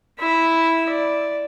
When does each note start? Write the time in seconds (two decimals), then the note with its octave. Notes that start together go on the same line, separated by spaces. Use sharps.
0.20 E4 E5
0.89 D5